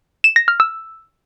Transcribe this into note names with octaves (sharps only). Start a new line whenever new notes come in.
E7
A#6
F6
E6